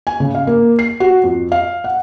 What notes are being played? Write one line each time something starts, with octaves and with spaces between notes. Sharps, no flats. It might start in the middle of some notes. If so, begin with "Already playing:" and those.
G#5
C#3
F5
A#3
C7
F#4
F2
F5
F#5